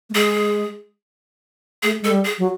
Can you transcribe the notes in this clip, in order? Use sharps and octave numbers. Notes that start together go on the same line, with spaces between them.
A3
G#3 G#4
A3 G#4
G#3 A4
G3
G#4
F#3